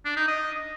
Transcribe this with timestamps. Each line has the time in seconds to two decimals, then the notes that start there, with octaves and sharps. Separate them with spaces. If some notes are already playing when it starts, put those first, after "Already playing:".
0.05 D4
0.17 D#4
0.28 D#5